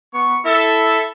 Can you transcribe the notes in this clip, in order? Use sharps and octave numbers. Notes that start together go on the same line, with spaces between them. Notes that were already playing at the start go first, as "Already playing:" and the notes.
B3 C#6
E4 A4 E5